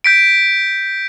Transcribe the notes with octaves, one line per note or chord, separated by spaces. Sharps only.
G6 B6 D7